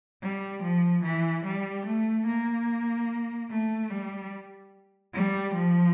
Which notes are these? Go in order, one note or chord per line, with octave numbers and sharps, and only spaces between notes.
G3
F3
E3
G3
A3
A#3
A3
G3
G3
F3